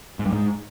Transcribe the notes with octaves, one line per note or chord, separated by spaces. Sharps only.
G#2
G2
G#2